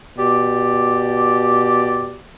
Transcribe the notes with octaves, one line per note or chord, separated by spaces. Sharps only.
B2 G4 D5